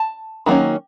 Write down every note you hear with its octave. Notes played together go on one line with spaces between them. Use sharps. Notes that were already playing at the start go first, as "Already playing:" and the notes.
Already playing: A5
D#3 F#3 A#3 C#4